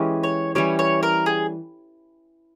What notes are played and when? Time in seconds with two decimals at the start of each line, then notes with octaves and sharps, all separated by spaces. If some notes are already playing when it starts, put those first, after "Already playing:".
Already playing: E3 G#3 C#4 G4
0.23 C#5
0.55 E3 G3 C#4 C#5
0.79 C#5
1.03 A#4
1.26 G#4